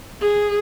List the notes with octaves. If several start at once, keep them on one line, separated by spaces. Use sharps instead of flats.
G#4